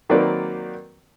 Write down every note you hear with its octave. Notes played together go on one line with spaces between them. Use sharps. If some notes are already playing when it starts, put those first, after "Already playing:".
D#3 F#3 A#3 C4 B4 D5